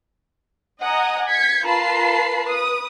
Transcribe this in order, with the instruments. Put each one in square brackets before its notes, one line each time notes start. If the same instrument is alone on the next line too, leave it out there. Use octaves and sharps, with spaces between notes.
[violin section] D#5 F#5 G#5 A#5 D#6
G#6 B6 C#7
F4 A#4 B4 A5 B5 C7
B4 D#6